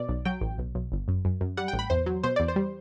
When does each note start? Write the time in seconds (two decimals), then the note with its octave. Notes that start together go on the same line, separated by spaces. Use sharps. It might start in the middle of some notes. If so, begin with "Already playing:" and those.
Already playing: B2 D5
0.09 B1
0.25 F#3 G5
0.41 A1
0.58 B1
0.75 B1
0.92 G1
1.08 F#2
1.25 F#2
1.41 F#2
1.57 G3 F#5
1.68 G5
1.73 A1
1.79 B5
1.90 E2 C5
2.06 F#3
2.23 B2 C5
2.36 E2 D5
2.48 C5
2.56 G3